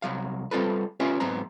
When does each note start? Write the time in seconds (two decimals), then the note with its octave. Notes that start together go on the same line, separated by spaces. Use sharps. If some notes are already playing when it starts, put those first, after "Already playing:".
0.02 C2 F#3 F5
0.51 G3 C4 F4 A4 B4
1.00 C#4 F4 G4 B4 E5 F5
1.20 G#2 F#3 B3 C4 A#5